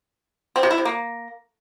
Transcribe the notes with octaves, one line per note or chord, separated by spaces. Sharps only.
C4
C3
E4
C3
A#3